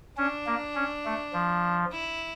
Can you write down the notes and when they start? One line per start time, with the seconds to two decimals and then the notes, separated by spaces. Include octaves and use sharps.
0.18 C#4 D4
0.46 A#3
0.75 C#4
1.05 A3
1.33 F3
1.91 E4